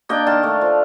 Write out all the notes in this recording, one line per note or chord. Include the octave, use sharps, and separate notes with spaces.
A#3 D4 D#5 G5
D#3 F5 A5
A3 D4
F3